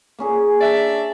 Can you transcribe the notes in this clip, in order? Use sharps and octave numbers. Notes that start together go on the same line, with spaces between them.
A#3 C#4 G#4
D4 D5 E5